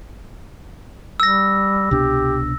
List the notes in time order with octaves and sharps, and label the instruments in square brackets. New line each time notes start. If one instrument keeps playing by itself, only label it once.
[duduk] G3 [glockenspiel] E6 A#6
[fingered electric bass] C2 B2 D4 [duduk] G4